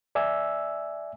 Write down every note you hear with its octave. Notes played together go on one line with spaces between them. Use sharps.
D5 E5 G#5 E6